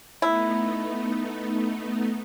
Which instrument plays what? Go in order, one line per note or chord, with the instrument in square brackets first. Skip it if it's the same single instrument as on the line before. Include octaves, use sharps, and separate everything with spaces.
[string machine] A3 B3 D#4 [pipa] E4